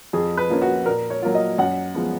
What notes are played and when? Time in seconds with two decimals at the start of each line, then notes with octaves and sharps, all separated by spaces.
0.13 F2 G#4
0.37 B4
0.50 F3 A#3 C#4
0.62 F#4
0.86 A#2 A#4
1.10 C#5
1.22 F#3 A#3 F4
1.35 D#5
1.58 F#2 F#5
1.95 F3 G#3 B3